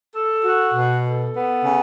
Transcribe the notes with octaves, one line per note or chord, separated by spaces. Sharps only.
A4
F#4
B2
A4
B3
C#3